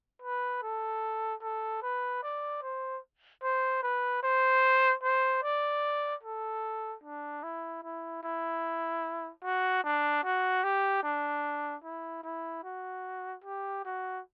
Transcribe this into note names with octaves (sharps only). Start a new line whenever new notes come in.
B4
A4
A4
B4
D5
C5
C5
B4
C5
C5
D5
A4
D4
E4
E4
E4
F#4
D4
F#4
G4
D4
E4
E4
F#4
G4
F#4